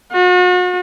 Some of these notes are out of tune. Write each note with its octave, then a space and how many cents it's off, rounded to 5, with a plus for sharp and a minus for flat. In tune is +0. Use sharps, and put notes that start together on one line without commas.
F#4 -40